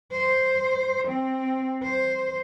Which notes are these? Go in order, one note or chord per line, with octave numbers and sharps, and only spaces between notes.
C5
C4
C5